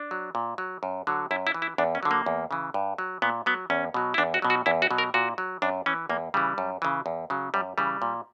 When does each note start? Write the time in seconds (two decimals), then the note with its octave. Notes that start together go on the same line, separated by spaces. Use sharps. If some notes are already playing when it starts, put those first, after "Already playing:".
Already playing: D4
0.11 F#3
0.35 A#2
0.58 F#3
0.83 F#2
1.07 D3 F#3
1.31 F#2 E4
1.47 E4
1.54 E3
1.62 E4
1.78 E2 D4
1.95 C#4
2.03 D3 F#3
2.11 A#3
2.26 E2
2.51 C#3 E3
2.74 G2
2.98 F#3
3.22 A#2 B3
3.46 F#3 B3
3.70 E2 C#4
3.94 B2 F#3
4.14 E4
4.18 E2 D4
4.34 F#4
4.42 B2 F#3
4.50 F#4
4.66 E2 E4
4.82 F#4
4.91 B2 F#3
4.98 A#4
5.14 A#2 F#4
5.38 F#3
5.62 F#2 D4
5.86 E3 C#4
6.09 E2 A#3
6.34 C#3 E3 G3
6.58 F#2
6.82 C#3 E3
7.06 E2
7.30 C#3 F#3
7.54 F#2 G3
7.78 C#3 E3 G3
8.02 A#2